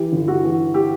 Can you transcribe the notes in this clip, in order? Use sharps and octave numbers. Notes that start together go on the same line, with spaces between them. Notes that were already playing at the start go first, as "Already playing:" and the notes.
Already playing: E3 G4
G1
F#4
E3
G4